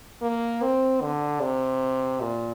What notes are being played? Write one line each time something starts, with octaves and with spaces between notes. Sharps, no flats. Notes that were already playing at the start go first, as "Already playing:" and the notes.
A#3
C4
D3
C3
A#2